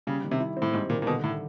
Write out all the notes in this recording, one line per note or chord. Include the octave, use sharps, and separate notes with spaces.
C#3 G3
D#3
C3
E4
C4
A2
G#2 G3
A#2 D#3
A#2
B2 D3
A2